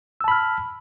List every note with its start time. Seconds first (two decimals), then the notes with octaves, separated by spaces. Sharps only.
0.21 E6
0.24 A5
0.28 B5
0.31 F6